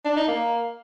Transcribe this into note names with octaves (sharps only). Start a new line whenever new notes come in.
D4
D#4
A#3